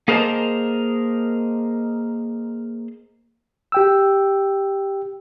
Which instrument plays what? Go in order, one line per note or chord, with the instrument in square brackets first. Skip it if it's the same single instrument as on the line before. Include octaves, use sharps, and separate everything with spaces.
[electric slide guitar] A#3 G#4 A#4 C5 D#5 A5
[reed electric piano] G4 G5 E6